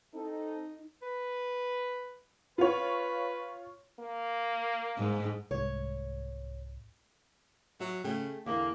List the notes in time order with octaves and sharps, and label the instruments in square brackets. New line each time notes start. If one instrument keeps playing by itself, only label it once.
[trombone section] C4 A4 [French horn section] D#4
[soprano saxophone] B4
[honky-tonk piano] F4 C#5 [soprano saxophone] B4
[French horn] A#3
[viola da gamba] G#2
[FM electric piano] C2 G#2 [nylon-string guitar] C#5
[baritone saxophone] F#3 [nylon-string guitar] E5
[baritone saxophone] C#3 [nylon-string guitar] A3 G5
[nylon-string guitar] E2 A#4 F5 [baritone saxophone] D3 [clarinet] A#3